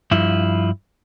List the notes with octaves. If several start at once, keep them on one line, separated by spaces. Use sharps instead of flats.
G2 F3 E4